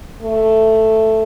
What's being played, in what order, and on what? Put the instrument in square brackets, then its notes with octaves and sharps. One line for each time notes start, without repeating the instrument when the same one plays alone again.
[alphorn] A3